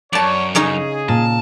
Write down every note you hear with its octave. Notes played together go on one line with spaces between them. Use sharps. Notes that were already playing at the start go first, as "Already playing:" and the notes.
F#2 C#5 D5 A5
C#3 C#4 D#4 G#4
A#2 A5